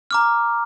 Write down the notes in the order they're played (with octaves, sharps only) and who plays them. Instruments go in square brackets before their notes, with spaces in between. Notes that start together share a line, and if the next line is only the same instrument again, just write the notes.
[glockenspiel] A#5 D6 F6